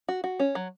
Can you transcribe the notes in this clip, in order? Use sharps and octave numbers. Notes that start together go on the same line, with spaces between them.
F#4
F#4
C#4
F#3